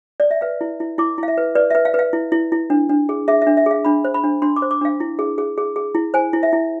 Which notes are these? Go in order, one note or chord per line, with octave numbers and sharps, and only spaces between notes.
D5
E5
B4 F5
E4
E4
E4 D6
E4
F5
E5
B4
B4 D5
B4 E5
F5
B4
F5
E4
E4
E4
D4
D4
G#4
G#4 E5
E5
D4
E5
G#4 F5
D4 B5
C5
B5
D4
D4 C6
D6
C5
D6
D4 F5
E4
G#4
G#4
G#4
G#4
E4
C5 G#5
E4
E5
E4